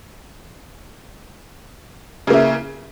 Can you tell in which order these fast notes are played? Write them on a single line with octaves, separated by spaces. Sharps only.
C#3 A#3 E4